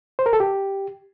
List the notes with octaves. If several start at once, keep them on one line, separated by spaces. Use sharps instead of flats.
C5
A#4
A4
G4